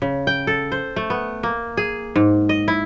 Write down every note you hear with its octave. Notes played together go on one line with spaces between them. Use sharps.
C#3
G5
A4
C5
A3
B3
A#3
G#4
G#2
D#5
E4